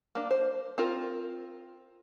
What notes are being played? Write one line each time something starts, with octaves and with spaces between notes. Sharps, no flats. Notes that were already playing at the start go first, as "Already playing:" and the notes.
A#3 D4
C5
C4 F4 A#4